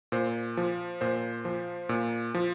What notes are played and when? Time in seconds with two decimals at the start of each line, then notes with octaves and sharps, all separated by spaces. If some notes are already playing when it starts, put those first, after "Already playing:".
0.12 A#2 C5
0.57 F3
1.01 A#2 C5
1.45 F3
1.89 A#2
2.34 F3